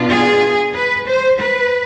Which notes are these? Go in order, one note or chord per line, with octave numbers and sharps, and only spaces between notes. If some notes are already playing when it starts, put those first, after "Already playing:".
Already playing: B2 B3 D4 F4
G#4
B4
C5
B4